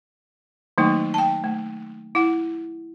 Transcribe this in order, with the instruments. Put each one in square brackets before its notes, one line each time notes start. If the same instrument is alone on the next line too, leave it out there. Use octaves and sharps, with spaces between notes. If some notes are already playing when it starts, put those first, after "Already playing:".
[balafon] D#3 F#3 A3 A#3 D#4
G5 A5
A3
E4 F#5